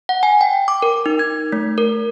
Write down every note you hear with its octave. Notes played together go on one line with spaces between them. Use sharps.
F#5
G#5
G5
D6
A#4
D#4
G#6
A3
A#4